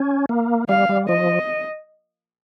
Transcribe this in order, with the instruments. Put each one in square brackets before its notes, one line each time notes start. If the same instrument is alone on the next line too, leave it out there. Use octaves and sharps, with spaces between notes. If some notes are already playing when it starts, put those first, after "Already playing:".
Already playing: [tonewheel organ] C#4
A#3
[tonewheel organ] G3 [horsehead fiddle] F5
[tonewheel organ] G3
[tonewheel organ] F3 [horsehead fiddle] D#5